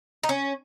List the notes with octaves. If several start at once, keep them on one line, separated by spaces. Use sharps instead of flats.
D#4
C#4